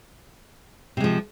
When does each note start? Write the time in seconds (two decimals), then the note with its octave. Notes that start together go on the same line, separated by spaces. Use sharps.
0.97 C3
1.00 G#3
1.04 F3